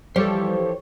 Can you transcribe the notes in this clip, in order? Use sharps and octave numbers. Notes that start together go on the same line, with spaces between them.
E3 F3 G3 G4 A4 C5 C#5